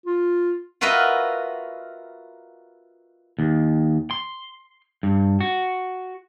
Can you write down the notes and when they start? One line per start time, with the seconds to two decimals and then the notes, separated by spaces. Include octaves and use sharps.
0.06 F4
0.81 F4 F#4 A#4 B4 D#5 E5
3.39 D#2
4.11 C6
5.03 G2
5.40 F#4